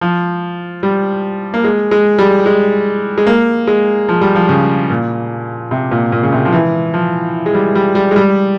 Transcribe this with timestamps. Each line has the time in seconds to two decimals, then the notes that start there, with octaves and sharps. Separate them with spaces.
0.01 F3
0.83 G3
1.54 A#3
1.64 G#3
1.91 G#3
2.18 G3
2.46 G#3
3.18 G#3
3.27 A#3
3.67 G#3
4.09 F3
4.21 G3
4.35 F3
4.49 C#3
4.90 A#2
5.71 C3
5.91 A#2
6.12 A#2
6.23 C#3
6.33 C3
6.45 F3
6.53 E3
6.94 F3
7.46 G#3
7.54 G3
7.75 G3
7.95 G3
8.11 G#3
8.16 G3